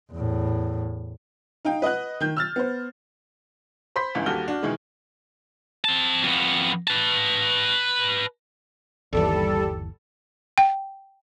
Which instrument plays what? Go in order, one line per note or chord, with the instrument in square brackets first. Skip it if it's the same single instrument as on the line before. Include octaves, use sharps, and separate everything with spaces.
[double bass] E2 A2
[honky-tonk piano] D#4 F5 G5
B4 D#5 F#5 F#6
D#3 G6
E6 F6 A6
B3 C5
[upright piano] C5 B5 C6 G6 B6
G1 C#2 E3
D#2 G3 F#4 A4 F6 G7
D4 F#4
B2 D#3 E3 G#3
[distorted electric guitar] C4 A5
F2 B3
B4 A5
[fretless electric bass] G1 D#2 E3 [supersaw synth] G3 A4
[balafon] G5